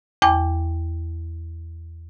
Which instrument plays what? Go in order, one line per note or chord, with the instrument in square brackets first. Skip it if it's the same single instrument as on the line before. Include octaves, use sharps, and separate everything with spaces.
[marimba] E2 G5 D6